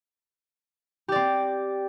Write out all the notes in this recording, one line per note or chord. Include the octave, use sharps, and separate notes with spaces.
C4 G4 D5